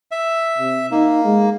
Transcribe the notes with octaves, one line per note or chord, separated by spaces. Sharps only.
E5
C3
A#3 D#4
G#3